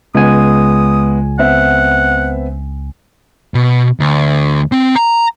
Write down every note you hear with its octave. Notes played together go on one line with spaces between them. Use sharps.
C#2 G#3 B3 G#5 D#6
B3 C4 E5 F#5
B2
D2
C4
A#5